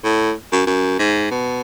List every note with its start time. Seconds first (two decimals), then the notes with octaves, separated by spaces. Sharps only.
0.04 A2
0.52 F#2
0.67 F#2
0.99 G#2
1.31 B2